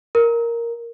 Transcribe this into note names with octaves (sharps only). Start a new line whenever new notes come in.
A#4